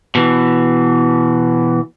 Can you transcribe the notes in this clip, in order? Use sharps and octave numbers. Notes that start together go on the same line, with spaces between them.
B2 E3